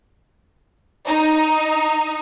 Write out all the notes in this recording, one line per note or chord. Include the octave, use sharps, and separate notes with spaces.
D#4